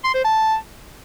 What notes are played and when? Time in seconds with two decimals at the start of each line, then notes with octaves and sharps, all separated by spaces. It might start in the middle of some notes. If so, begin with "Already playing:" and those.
0.04 C6
0.14 C5
0.25 A5